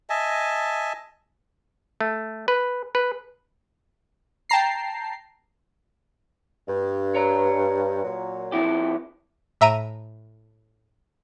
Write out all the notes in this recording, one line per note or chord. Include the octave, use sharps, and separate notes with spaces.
D#5 E5 G#5 A5
A3
B4
B4
G5 A5 A#5 C7
G2
C#5 A#5
A#2 F#3
F2 E4 G4
A2 E5 A#5 D7 D#7